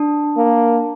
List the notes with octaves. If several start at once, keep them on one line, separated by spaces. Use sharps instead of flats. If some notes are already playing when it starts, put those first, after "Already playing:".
Already playing: D4
A#3